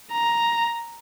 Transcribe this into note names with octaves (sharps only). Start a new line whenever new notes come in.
A#5